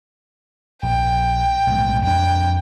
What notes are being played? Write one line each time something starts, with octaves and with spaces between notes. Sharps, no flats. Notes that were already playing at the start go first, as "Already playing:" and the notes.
A#1 G5
B1 A2 G#3
F2 D4 G5